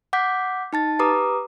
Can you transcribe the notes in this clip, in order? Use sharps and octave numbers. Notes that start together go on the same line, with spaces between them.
F#5 D6 G6 B6
D#4 A5 A6
G4 B4 A#5 D6 D#6